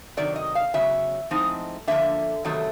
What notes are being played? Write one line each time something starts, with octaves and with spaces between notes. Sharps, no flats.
C3 D#3 F#3 D5
D#5
F5
C#3 F#3 B3 E5
A2 F3 G#3 C4 D#4
D3 F3 A#3 D4 E5
E2 C3 D#3 F#3 A3